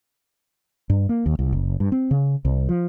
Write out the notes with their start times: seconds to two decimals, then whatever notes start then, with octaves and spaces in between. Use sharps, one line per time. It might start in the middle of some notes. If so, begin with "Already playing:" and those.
0.90 G2
1.09 A#3
1.26 D#2
1.39 C2
1.53 F#1
1.80 G2
1.92 C4
2.11 C#3
2.45 C2
2.69 F3